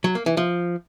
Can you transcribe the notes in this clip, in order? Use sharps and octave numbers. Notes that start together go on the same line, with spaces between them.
F#3
A#3
E3
F3